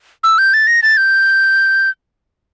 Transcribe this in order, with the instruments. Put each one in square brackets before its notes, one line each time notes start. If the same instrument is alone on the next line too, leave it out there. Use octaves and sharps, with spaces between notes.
[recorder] E6
G6
A6
A#6
A6
G6